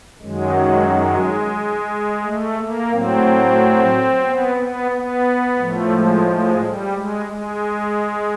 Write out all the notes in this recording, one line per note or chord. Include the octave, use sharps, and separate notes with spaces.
F#2 D#3 F#3 G#3
G#3
G#3
A3
A#3
A2 F#3 C4
B3
B3
B3
A2 F3 A3
G#3
G#3
G3
G#3
G#3